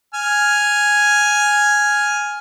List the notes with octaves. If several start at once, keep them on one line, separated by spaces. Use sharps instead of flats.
G#5 F6